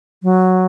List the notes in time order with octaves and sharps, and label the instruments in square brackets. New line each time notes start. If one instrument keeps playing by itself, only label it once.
[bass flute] F#3